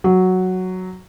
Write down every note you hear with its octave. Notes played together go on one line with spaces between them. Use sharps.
F#3